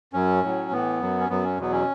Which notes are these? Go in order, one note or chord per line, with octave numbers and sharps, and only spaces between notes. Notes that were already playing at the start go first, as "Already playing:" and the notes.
F#2 F#3 C#4
A2 F#3
A2 E3 B3
F#2 F#3
C#4
F#2 F#3 B3
C#4
E2 B2 F#3 B3
C#4